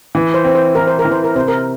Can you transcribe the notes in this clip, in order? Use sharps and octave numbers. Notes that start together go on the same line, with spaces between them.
E3
C5
C4
C5
E3 A#4
C5
A#4
E3
C5
A#4
C3 C5
A#4